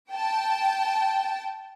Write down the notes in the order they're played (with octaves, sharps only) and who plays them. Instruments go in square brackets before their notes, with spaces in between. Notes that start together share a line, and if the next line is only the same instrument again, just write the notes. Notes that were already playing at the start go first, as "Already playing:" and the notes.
[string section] G5 A5